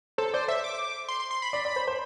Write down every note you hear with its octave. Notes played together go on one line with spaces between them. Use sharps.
A4 C5
C5 D5
C5 E5
D6
C6
C6
C6
B5
D5
D5
C5
C5